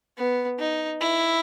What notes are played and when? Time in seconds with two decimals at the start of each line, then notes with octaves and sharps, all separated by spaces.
0.18 B3
0.59 D#4
1.01 E4